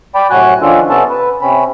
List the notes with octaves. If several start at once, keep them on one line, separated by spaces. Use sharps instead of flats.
D5 G5 B5
A2 C3 F#3 F#4 G#5 F#6
D#3 F3 C#4 D4 F4 A4
C3 B3 C#4 A4 A5
B4
C3 C4 C#4 B5